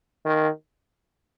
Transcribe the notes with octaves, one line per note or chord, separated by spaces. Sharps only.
D#3